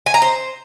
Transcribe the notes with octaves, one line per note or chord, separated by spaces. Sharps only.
G#5
A#5
C5